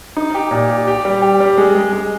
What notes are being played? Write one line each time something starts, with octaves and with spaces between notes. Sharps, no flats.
D#4
G4
A#2
G4
G4
G3
G4
G3
G#3
G#3
G#3